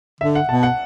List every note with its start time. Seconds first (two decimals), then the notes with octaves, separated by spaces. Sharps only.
0.21 D3 E5
0.35 F#5
0.49 B2 A5
0.63 F#5